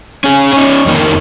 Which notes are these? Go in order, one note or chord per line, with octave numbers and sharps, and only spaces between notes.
C#4 G#4
C#4 D#4
F2 D#3 A#3